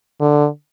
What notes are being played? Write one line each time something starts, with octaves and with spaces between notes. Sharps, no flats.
D3